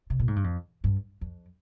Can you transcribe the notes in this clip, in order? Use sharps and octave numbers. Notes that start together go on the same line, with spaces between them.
C3
A#2
G#2
G2
F2
G2
F2